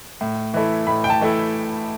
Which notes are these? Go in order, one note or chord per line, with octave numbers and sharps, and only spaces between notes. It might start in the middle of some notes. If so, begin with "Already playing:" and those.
A2
E3 A3 E4
A2 B5
G5
A5
E3 A3 E4